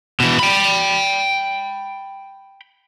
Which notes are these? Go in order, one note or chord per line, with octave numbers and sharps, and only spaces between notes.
B2 E3
G5 B5